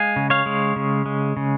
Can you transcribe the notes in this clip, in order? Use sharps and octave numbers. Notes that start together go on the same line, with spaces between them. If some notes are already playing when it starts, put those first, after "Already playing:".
Already playing: G#3 F5 G#5
C#3
C#5 F5
G#3
C#3
G#3
C#3